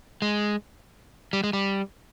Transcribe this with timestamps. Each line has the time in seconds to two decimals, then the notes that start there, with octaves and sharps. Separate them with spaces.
0.22 G#3
1.33 G3
1.44 G#3
1.53 G3